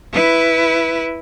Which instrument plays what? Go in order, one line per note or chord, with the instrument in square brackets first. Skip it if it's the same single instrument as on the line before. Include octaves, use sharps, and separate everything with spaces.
[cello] E4 B4